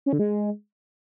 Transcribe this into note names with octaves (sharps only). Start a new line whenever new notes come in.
C#4
D3
G#3